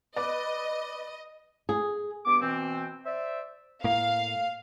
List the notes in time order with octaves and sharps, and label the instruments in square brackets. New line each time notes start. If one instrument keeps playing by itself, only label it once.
[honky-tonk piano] B4 D5 [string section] D#5
[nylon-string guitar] G#4
[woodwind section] G2 B3 D6
B2 E3 C4
C5 D5 E5
[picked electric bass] A2 A#3 [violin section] F5